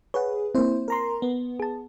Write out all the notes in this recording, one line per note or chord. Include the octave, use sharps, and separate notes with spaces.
G#4 B4 C#5 F#5
A#3 C4 E4 C5
A#4 A#5 C6
B3
G#4 A5